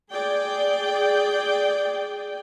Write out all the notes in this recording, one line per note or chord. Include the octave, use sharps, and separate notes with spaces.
G#4 D5 G5